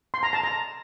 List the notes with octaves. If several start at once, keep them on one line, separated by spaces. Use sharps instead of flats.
C6
A#5
A5
A#5